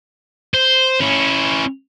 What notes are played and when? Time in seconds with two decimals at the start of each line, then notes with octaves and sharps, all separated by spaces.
0.54 C5
1.00 C#4 E4